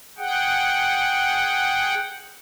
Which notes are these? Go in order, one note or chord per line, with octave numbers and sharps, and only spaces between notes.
G#4 F#5 G5